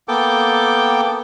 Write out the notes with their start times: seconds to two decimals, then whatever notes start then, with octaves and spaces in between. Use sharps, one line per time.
0.08 A#3 B3 A4 G5 D6